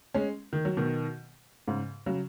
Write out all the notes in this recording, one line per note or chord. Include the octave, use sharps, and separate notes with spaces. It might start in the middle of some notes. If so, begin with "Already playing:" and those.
G#3 C#4
D#3
F#3
B2 D#3
G#2 C#3
C#3 F#3